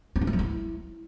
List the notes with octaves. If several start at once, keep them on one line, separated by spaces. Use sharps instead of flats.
C#4
D4
A3
F#3
E4